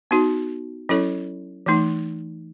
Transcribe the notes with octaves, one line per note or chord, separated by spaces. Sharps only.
B3 D#4 F#4
F#3 C#4 E4 A4 C#5
E3 A3 D#4